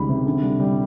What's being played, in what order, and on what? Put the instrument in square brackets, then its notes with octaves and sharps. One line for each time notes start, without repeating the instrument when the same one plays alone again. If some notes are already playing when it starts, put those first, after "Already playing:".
Already playing: [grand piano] C#2 D#3 G3 B5
C3
D3
G3
G3